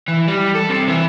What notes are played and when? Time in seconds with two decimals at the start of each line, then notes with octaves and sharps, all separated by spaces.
0.08 E3
0.28 G3
0.55 A4
0.70 C3
0.88 E3